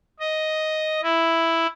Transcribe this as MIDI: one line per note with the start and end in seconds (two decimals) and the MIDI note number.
0.20 1.01 75
1.03 1.67 64